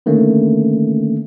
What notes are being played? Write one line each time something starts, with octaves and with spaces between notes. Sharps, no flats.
D3 D#3 A3 A#3 C#4